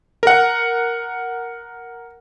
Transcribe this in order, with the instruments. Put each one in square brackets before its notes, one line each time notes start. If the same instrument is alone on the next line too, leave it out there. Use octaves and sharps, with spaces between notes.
[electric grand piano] A#4 F#5